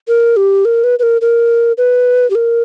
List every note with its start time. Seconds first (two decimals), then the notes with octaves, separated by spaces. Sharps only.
0.08 A#4
0.37 G4
0.65 A#4
0.84 B4
0.99 B4
1.03 A#4
1.21 A#4
1.78 B4
2.30 G4
2.35 A#4